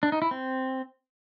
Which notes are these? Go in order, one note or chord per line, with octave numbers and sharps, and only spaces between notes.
D4
D#4
E4
C4